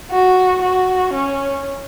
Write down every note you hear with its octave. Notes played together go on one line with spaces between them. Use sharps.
F#4
F#4
C#4